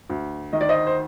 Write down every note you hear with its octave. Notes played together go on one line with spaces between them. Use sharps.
D2
D#3 D#5
D5
C5 D#5
C5